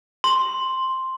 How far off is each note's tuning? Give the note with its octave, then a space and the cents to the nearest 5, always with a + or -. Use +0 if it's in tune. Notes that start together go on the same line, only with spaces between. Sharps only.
C6 +5